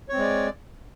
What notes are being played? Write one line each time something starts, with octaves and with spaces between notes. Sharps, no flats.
G#3 C4 C#5 D5